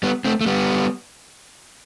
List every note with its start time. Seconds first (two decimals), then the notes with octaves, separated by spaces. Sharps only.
0.03 G3 B3
0.25 A3 C4
0.41 A3
0.46 G3 B3